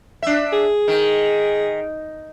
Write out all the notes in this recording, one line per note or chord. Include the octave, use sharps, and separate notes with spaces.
D4 E5
G#4
D#3